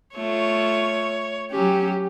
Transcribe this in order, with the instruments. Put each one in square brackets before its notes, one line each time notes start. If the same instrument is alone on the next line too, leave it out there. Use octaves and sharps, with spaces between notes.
[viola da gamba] A3 F4 [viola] C#5
[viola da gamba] F#3 C#4 [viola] G4